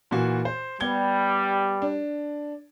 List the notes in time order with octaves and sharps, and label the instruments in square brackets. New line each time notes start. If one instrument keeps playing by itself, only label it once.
[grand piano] A#2 E3 F#4
C5
[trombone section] G3 [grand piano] B3 G#6 G7
[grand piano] D4